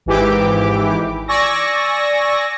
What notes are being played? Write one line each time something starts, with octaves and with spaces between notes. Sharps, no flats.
G#1 G#2 E3 E4 G4 D6
D5 G#5 C#6 E6 A#6